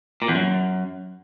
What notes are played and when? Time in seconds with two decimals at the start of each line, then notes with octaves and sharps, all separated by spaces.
0.22 A#2
0.28 E2
0.35 F#2